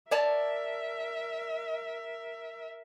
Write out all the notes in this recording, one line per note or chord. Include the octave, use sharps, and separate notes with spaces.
A#4 C#5 D5 E5 A5